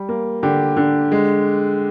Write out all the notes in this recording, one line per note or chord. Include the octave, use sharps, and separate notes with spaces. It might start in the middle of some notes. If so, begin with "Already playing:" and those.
Already playing: G3
A#3
D3 G4
D3
G#3